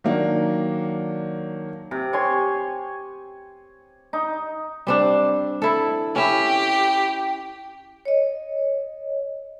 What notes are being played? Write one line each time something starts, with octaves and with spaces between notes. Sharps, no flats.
D#3 F#3 A#3 D4
C3
C#5 G#5 C6
D#4
G3 C4 D4
E4 A4
C#4 E4 G4
C#5 D#5